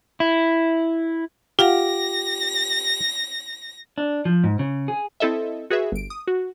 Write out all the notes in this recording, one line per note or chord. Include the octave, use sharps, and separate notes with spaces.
E4
F4 G4 F5 F#5 A#6
D4
F3
G#2
C#3
G#4
C4 E4 A4 D#5 E5
F#4 G#4 B4 E5
G1 D7
D#6
F#4